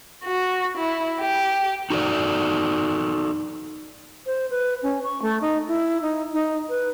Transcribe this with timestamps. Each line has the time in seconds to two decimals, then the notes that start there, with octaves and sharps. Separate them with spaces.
0.24 F#4
0.77 E4
1.19 G4
1.90 D#4 F#4 A4 D5
4.26 C5
4.50 B4
4.83 C#4
5.04 C#6
5.22 A3
5.41 D#4
5.68 E4
6.02 D#4
6.33 D#4
6.69 B4